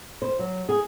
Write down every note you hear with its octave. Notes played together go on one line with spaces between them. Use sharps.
C5
F#3
G#4